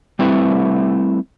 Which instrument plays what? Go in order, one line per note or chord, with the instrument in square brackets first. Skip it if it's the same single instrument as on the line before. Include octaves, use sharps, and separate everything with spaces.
[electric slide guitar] G3 A3 C4 E4 B4 E5